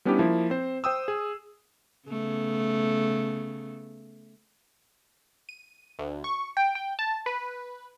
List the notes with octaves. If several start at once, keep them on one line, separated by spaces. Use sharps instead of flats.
G3 B3 C#4 D4 E4 G4
F3 A#3 E4
C4 C5
C5 G5 D#6 E6
G#4
C#3 A3 B3
D#7
D2
C#6
G5
G5
A5
B4